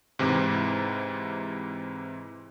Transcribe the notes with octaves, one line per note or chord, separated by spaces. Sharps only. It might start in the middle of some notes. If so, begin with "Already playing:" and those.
G#2 C3 E3